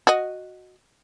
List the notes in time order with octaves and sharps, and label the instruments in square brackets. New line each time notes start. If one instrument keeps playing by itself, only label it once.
[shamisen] F#4 D#5